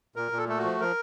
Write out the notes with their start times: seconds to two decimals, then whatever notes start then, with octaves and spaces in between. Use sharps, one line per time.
0.16 A#2 A#4
0.32 A#2
0.37 A4
0.48 A3 A4
0.59 F#4
0.64 F3
0.80 F3 A#4